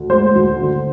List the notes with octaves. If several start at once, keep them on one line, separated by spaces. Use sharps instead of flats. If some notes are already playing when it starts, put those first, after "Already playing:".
Already playing: D2
G#3 C5
D2
D3